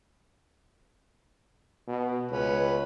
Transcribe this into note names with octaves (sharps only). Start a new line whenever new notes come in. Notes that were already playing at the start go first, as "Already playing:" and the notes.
B2
C#2 C#4 B4